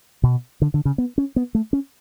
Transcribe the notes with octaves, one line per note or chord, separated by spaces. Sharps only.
B2
D3
D3
C#3
B3
C#4
B3
A3
C#4